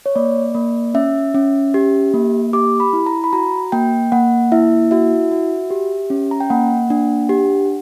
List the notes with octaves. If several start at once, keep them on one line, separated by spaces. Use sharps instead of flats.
C#5
A#3 D5
A#3
C#4 E5
C#4
G4
A#3
G4 D6
B5
E4
A#5
B5
F#4 A#5
A#3 G5
A#3 F#5
E4 E5
F#4 E5
F#4
G4
C#4
A#5
G5
A#3 F#5
D4
G4